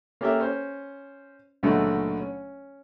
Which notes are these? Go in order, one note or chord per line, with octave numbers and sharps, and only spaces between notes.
A#3 C#4 G4 A4 A#4 E5
C#4 C5
C#2 A#2 D3 F#3 G#3 A3
C#4